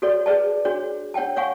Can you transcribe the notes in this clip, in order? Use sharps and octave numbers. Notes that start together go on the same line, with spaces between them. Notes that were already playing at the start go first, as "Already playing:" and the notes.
F#4 A4 C#5 D5
G#4 B4 D5 A5
D4 F#4 G#4 C#5
D4 C#5 F#5 G5 A5
C#5 F5 F#5 G#5 C#6